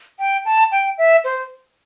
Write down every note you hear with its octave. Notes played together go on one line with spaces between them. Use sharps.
G5
A5
G5
E5
C5